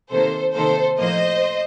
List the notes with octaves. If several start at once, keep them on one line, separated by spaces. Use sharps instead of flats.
C3 D#3 A#3 A4 C5
C3 D#3 A#3 A4 C5
A2 F3 A#3 C5 D#5